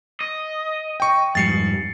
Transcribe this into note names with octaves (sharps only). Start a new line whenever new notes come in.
D#5
G5 C#6
F2 G#2 G3 A6 C7 C#7